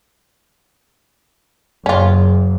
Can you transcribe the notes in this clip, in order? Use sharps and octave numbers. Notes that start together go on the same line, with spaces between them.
F#1 C#4 F4